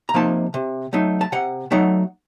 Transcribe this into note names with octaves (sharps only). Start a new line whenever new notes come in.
A#5
C3 F3 A#3 D#4 A5
C3
F#3 A3 D#4
A5
C3 F#5
F#3 A3 D#4 F#5